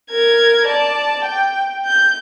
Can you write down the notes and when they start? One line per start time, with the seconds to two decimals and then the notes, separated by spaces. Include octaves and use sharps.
0.12 A#4 G#6
0.67 D5 A5
1.24 G5
1.85 G6